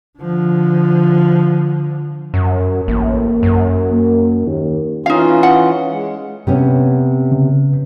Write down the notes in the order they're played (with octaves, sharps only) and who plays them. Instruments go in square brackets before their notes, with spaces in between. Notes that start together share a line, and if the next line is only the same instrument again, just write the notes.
[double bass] D3 F3
[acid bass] F#2
[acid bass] A1 [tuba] A#3
[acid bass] F#2
[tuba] A#3
D#2
[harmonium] E3 C#4 F4 [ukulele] D#4 F5
[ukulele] F#5
[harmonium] G#3
[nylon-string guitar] C3 B3 C#4
[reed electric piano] C#3